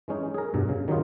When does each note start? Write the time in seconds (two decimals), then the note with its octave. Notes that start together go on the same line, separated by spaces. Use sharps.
0.08 E3 G#3 C#4 D#4
0.34 G#4 A#4
0.54 G2 B2
0.69 C#3
0.88 D#3 F#3 G3 D#4 F4